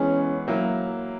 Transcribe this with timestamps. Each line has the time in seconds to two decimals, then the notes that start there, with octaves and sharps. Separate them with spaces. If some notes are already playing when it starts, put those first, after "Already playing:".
Already playing: E3 G#3 B3 C#4
0.48 F#3 A#3 E4